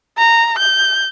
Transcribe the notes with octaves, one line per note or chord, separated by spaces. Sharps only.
A#5
G6